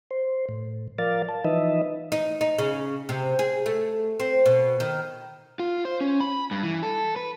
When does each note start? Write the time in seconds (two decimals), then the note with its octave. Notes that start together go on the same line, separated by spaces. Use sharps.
0.11 C5
0.49 A2
0.98 F3 A#4 D5 F5 A6
1.29 A5
1.45 E3 F3 D#4 B4 D#5 E5
2.12 D#4
2.41 D#4
2.58 C#3
3.09 C3
3.39 G#4
3.66 A3
4.20 C4
4.46 B2
4.80 D#3
5.59 F4
5.85 C5
6.01 C#4
6.20 B5
6.51 G2
6.63 E3
6.83 A4
7.16 B4